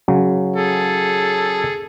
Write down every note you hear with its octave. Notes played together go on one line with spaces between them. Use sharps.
C#3 F#3
G#4 A4